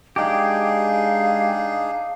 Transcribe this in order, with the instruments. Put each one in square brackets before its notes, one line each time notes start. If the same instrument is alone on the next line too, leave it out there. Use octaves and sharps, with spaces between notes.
[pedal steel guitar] G#3 G4 [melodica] D4 D#4 G#4 [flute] F5